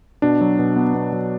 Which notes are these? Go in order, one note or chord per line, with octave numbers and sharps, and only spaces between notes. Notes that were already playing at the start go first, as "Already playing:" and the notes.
B2 D4
F#3
B2
B3
B2
F#3